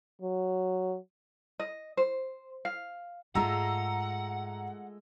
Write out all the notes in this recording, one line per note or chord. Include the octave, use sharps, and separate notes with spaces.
F#3
D#5
C5
F5
G#2 G#3 A3 F4 F#5 A#5 E6